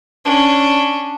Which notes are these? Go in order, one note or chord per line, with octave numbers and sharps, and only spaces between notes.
C#4 D4